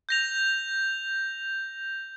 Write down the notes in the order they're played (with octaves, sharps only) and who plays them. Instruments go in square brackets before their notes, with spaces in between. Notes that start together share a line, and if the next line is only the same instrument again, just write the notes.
[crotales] G6 A#6 F7